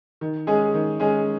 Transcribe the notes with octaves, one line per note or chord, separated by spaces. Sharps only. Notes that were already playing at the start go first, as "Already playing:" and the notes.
D#3
G#3 C#4 G#4
D#3
G#3 C#4 G#4